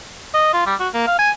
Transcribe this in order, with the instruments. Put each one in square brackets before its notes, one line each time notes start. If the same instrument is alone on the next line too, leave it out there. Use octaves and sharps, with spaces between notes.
[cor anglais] D#5
F4
G3
F#4
A#3
F5
G#5